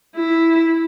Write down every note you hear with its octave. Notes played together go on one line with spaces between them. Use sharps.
E4